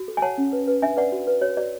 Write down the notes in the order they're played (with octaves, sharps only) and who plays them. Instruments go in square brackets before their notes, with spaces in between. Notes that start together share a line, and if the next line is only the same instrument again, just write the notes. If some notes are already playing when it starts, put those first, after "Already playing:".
Already playing: [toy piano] F#4
A4
G#5
C#5 F#5 A5
C#4
B4
B4
D4 E5 G#5
B4 D5 F#5
F#4
B4
F#4 C#5
F#4 D5